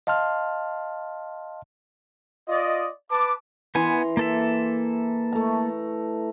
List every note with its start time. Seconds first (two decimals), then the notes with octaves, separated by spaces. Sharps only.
0.07 D#5 F5 A5 C6 F6
2.47 F4 D5 D#5
3.10 B4 A5 D6
3.75 E3 B3 G#5 A#5 C6
4.17 A#3 A4 E5
5.32 A3 A#5